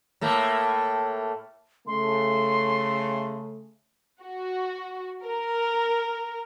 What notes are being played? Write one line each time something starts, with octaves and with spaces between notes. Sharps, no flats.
A2 A3 A#3
C#3 A3 C6
F#4
A#4